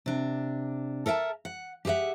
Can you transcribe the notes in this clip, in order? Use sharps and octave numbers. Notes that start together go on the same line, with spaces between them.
C3 D4
A4 A#4 E5 G5 A5
F#5
G4 G#4 B4 E5 F#5